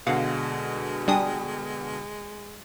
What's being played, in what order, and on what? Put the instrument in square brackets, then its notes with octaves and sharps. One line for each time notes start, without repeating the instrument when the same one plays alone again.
[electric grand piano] B2 D3 [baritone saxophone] G#3 [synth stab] F5 F#5
[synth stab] G3 D4 D#6 [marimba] G5 G#5